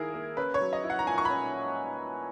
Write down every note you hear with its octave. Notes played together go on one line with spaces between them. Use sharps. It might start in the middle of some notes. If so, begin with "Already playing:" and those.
Already playing: D#3 A#3 E4 G#4 A#4
A#3
C#4 B4
C#5
F#3
D#5
E4
F#5
A#5
A#2 G#5
C#6
C#4 B5